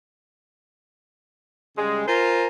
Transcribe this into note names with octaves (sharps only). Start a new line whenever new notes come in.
C#3 G3 G#3
F4 A#4 C5 G#5 A#5